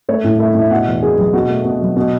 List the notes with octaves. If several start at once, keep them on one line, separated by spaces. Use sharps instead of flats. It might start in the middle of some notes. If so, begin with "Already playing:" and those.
A3 C#5
A2
A3 E5
A2 E5
B2 F#5
E2
B2 G#4
F#3
B2 F#4
A3
B2
F#3
B2